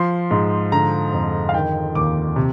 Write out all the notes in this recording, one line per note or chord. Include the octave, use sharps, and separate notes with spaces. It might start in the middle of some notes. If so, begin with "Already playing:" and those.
Already playing: F3 C6
G#2
D3 A#5
F2
F5
D#3 G5
D#2 D6
C3